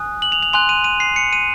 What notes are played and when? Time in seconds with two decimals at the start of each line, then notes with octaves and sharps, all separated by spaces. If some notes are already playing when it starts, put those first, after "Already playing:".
Already playing: G#5 D#6 F#6
0.22 F#7
0.32 F7
0.43 F7
0.53 G#5 C6 F#6 F7
0.69 D#7
0.84 D#7
1.00 C7
1.16 C#7
1.33 D#7